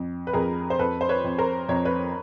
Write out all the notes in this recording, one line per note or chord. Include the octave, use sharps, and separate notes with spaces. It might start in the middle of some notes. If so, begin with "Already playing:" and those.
Already playing: F2
B4
F2 G#4 A#4
C5
F2 A4 B4
C5
B4 C#5
F2
A#4 C5
F2 C#5
B4 C#5